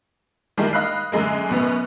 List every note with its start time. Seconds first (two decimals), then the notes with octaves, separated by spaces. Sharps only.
0.57 D#3 G3 G#3 A#3 D4 E4
0.73 D#5 F5 B5 F#6 C7
1.12 F#2 D3 G#3 A#3
1.49 F#2 B2 B3